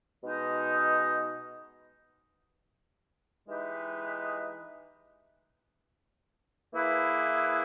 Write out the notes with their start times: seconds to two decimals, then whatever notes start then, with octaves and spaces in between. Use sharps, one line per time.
0.23 B2 G#3 D#4
3.48 E3 G#3 D#4 G4 B4
6.73 E3 A#3 E4 G#4 B4